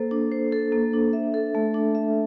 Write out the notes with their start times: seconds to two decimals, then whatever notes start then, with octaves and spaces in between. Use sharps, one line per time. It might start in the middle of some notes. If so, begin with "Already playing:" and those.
Already playing: A#3 A4 C5
0.11 D4
0.32 C5
0.52 A4
0.72 A#3
0.93 D4
1.13 E5
1.34 A4
1.55 A3
1.74 D4
1.95 E5